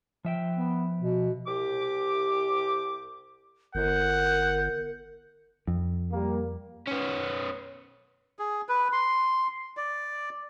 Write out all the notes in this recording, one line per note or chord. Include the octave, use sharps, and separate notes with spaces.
F3 E5 G5
B3
B2
C2 G4 D6
G1 A#4 F#5 G6
F2
G3 A#3
B3 C#4
G#4
B4
C6
D5